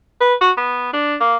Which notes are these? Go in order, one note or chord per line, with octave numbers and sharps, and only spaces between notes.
B4
F#4
B3
D4
A#3